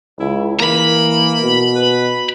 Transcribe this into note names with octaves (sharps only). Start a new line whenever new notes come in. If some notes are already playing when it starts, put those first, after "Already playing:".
C#2 E4
E3 A#3 A#5 B5
B2
B4